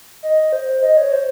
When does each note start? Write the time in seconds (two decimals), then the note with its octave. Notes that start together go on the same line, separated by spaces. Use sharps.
0.23 D#5
0.53 C5
0.82 D#5
0.97 C#5
1.12 C5